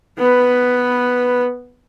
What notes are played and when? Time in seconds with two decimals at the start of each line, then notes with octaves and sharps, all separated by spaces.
0.18 B3 B4